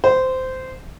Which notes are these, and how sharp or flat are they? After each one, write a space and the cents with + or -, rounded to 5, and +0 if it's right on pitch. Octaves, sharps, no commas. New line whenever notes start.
C5 -15